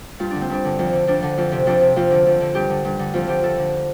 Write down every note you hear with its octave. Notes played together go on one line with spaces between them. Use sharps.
G2 F4
D3 D4
C4
G2 D4
D3
F2
D3
F2 D4
D3
F2
C3
F2 D4
C3
F2 F4
D3
F2
D3
G2 G4
D3
G2
D3
F2 F4
D3 G4
F2 A4
D3